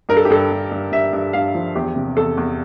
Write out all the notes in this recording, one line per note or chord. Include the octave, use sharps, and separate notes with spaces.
G2 A#4
A4
G4
G2 A4
G2
G2
G2 E5
G2
G2 F5
F3
E2 G4
C3
E2 A4
E2